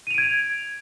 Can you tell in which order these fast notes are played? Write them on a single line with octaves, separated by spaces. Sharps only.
D#7 F7 D7 G#6